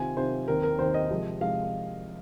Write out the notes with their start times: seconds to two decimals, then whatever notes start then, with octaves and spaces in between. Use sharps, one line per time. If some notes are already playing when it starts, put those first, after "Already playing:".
Already playing: C3 D#3 C4 F4 G#5
0.17 C3 D#3 C4 F4 C5
0.48 D#2 D#3 C4 A#4
0.63 A#4
0.79 D#2 D#3 C4 C5
0.94 D#5
1.10 C3 F3 G#3
1.41 C3 F3 G#3 F5